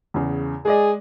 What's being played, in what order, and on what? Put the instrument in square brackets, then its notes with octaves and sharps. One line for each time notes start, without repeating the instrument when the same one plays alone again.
[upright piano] E2 C#3
[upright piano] G#3 D5 D#5 [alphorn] G#4